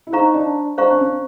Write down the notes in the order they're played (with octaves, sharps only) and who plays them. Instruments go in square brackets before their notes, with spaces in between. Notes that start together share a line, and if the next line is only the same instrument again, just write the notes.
[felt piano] E4
[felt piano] D#4 [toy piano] C5 F5 A#5 C#6
[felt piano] D4
[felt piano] D4 [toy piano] C5 F5 A#5 C#6
[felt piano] C4
C#4